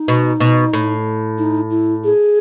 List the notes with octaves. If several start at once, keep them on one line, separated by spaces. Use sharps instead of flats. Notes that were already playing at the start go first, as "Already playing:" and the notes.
Already playing: D#4
B2
B2
A2
D#4
E4
G#4